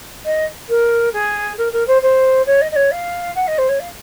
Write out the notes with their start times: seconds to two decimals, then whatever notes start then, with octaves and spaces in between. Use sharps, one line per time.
0.25 D#5
0.69 A#4
1.13 G#4
1.57 A#4
1.72 A#4
1.87 C5
2.02 C5
2.46 C#5
2.61 D#5
2.71 D#5
2.76 C#5
2.91 F5
3.35 F#5
3.47 D#5
3.58 C5
3.69 C#5
3.80 F5